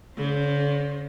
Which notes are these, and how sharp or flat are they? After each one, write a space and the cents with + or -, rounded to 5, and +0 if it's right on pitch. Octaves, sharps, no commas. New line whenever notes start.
D3 -45 C#4 +0 C5 +20